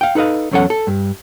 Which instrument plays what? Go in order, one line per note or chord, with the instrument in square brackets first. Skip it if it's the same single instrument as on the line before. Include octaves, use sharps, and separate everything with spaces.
[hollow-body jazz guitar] F5 G5
D#4 A4 B4 D#5 F5
E2 F#3 C#4 A4 F#5
A4
G2